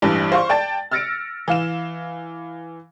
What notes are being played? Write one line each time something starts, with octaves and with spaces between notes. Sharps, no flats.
A1 G2 E3 A5
C5 F5 C#6
D5 G5 A5 A6
E6 F6 A6 A#6 C#7 D7
E3 F5 E7